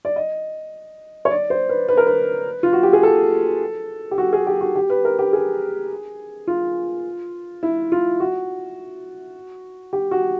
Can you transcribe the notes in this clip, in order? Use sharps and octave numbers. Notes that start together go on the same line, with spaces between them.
D5
D#5
C#5
D5
C5
B4
B4
A#4
B4
F4
F#4
G4
G#4
A4
G4
F#4
G#4
G4
F#4
G4
B4
A#4
G4
G#4
F4
E4
F4
F#4
G4
F#4